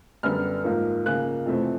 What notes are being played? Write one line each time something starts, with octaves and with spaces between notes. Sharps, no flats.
F#2 D3 G3 B3 F6
G#2 F3 A#3
C#3 F3 A#3 F#6
F2 C3 E3 A3 C4